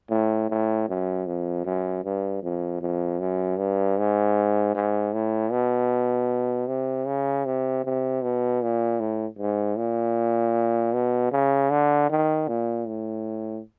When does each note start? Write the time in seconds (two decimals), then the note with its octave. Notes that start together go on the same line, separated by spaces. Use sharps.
0.10 A2
0.49 A2
0.89 F#2
1.26 F2
1.65 F#2
2.04 G2
2.43 F2
2.81 F2
3.20 F#2
3.58 G2
3.98 G#2
4.75 G#2
5.13 A2
5.51 B2
6.68 C3
7.07 C#3
7.45 C3
7.84 C3
8.22 B2
8.62 A#2
9.00 A2
9.39 G#2
9.77 A#2
10.94 B2
11.32 C#3
11.70 D3
12.09 D#3
12.48 A#2
12.87 A2